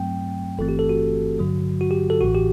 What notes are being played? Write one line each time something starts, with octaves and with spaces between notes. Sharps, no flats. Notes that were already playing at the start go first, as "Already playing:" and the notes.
Already playing: G2 F#3 A3 C4 G5
G1 G2 E3 A3 C4 A4
G4
A4
F#4
G2 D3 F#3
F#4
G4
A4
A1 A2 E3 F#4
G4